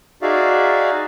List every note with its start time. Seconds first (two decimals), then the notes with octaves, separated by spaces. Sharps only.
0.22 D#4 F#4 G#4 D5 E5 F5